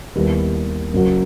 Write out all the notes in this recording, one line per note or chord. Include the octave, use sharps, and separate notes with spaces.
D#2 D#3 G3 B3 E4
F#1 F#2 F#3